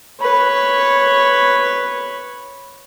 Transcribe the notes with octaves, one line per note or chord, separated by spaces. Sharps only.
B4 C#5